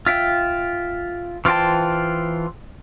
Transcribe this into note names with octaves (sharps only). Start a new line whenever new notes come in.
F4 E5 G5
E3 F4 C5 G5 A5